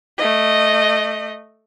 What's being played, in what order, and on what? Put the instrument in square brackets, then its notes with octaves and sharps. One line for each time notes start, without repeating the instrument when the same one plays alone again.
[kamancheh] A3 D#5